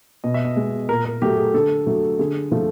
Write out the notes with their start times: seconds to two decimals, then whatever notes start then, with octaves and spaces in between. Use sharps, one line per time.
0.24 B2 D#5
0.34 E5
0.45 D#5
0.56 G#3
0.89 A#2 A#4
1.05 A#4
1.22 F#3 A3 G4
1.38 G#4
1.54 D3 A4
1.86 F#3 A3
2.19 D3 G#4
2.52 F3 A3